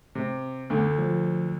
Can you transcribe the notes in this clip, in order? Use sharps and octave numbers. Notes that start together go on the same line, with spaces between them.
C3
D2 D3
F3